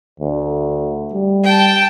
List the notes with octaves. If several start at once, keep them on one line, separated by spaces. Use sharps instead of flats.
D2
G3
G5 A5